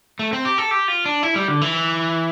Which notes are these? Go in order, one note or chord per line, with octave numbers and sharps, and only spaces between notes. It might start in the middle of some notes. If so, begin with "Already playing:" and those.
A3
C4
G4
A4
G4
F4
D4
E4
G3
D3
E3